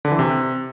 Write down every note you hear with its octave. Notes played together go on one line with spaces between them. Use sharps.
D3
E3
C3